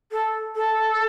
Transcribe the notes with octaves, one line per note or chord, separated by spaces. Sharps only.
A4
A4